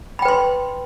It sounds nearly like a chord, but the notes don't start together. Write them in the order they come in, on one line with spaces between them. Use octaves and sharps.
B5 G5 B4 C6